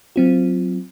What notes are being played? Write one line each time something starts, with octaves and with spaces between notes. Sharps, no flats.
F#3 C4 F4